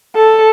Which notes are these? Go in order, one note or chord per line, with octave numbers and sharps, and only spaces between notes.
A4